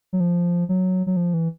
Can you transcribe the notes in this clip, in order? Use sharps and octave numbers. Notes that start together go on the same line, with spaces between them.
F#3
F3
F#3
F#3
F3
E3